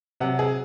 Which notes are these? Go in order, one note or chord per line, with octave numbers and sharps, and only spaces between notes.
C3 F#3 F#5
G#4